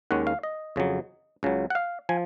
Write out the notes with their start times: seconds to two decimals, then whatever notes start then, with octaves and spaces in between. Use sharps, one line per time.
0.11 D#2 D#3 G#3 C#4 F#5
0.27 F5
0.43 D#5
0.76 F2 C#3 F#3
1.43 C#2 C#3 F#3
1.70 F#5
1.75 F5
2.09 F3 G#5